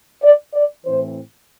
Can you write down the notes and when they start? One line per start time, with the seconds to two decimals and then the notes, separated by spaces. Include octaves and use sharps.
0.22 D5
0.54 D5
0.85 A2 E3 C4 C5